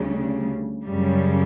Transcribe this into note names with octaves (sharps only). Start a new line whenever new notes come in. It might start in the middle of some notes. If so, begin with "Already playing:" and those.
Already playing: D2 C#3 G3
F#2 C#3 G3